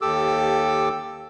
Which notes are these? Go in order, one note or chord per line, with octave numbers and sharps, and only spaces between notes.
D#2 G4 A4 D6 E6